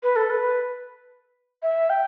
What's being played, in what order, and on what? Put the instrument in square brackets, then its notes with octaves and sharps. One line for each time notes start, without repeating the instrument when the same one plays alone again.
[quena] B4
A4
B4
E5
G5